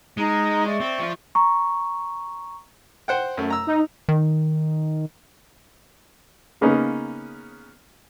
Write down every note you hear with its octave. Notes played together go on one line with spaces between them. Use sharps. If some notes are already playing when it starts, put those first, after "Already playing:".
G#3 D#4 A#5
D5 E5 C#6
C4
F3 F4
A#5 C#6
C5 F#5 G5
F#2 A3
A#5 E6
D#4
D#3
C#3 A#3 B3 C#4 D#4